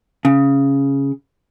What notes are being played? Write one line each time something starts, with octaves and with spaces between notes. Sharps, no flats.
C#3